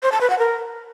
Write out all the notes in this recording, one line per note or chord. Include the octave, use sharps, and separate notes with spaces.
C5
A5
B4
F#5
A#4